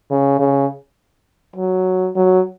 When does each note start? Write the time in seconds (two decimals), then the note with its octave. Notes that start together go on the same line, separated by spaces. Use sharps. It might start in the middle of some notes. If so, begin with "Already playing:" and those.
0.10 C#3
0.39 C#3
1.56 F#3
2.16 F#3